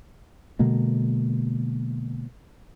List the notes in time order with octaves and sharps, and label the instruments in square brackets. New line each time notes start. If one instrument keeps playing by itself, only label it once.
[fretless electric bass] B2 D3 G#3 A#3